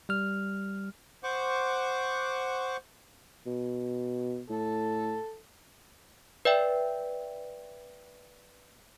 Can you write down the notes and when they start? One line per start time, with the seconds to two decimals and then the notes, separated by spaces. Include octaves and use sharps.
0.09 G3 F6
1.23 C5 F#5 C#6 D6
3.46 B2
4.50 A2 A4
6.45 B4 D5 E5 G5